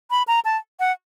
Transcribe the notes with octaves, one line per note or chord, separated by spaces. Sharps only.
B5
A#5
A5
F#5